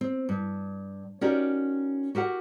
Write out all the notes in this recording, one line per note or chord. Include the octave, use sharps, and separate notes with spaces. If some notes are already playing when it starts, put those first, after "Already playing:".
C4
G2
C#4 D#4 F#4 G4 A#4 D5
F#4 G4 A#4 F#5